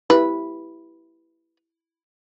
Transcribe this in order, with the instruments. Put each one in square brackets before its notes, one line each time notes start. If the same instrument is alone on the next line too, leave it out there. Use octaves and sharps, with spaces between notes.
[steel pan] E4 G4 [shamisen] B4